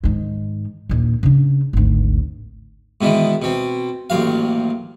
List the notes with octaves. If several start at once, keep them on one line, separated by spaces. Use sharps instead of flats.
G#2 D#3
A#1 D#2
C#3 D4
G#1 D2
G#2 B2 D#3 E3
B2 C4
A1 D#2 F#3 F5